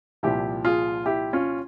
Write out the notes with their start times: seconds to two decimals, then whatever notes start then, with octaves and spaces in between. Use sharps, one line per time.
0.23 C2 A#2 F3 E4 G4
0.65 F4 G#4
1.06 E4 G4
1.33 C#4 F4